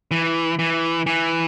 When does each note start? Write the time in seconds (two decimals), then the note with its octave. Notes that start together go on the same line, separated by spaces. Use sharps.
0.11 E3
0.59 E3
1.06 E3